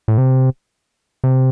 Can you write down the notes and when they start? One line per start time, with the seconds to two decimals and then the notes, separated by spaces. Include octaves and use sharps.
0.08 A2
0.18 C3
1.24 C3